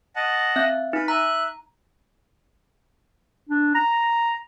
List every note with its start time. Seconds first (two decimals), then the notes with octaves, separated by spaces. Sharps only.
0.16 D#5 F#5 A5
0.56 C4 E5 G6
0.93 D#4 B4
1.08 E5 A#5 F#6
3.49 D4
3.75 A#5